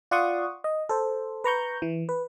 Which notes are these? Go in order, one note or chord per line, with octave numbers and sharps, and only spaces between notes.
F4 D5 F#5 C6 C#6 D#6
D#5
A4 C5
B4 A#5 C#6 G6
E3
B4